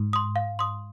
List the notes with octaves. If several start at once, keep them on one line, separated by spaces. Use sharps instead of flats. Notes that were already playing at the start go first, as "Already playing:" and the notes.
Already playing: G#2
C6 D#6
F5
C6 D#6